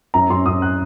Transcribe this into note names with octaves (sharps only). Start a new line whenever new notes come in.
F#2 A#5
F#2 C6
F#2 D#6
F#6